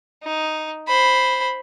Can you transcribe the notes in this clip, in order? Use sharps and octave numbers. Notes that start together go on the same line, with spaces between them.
D#4
C5 B5